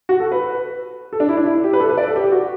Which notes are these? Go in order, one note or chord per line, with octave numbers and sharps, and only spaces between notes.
F#4
A4
B4
A4
D4
E4
D4
E4
G4
B4
A4
B4
D5
A4
G4
F#4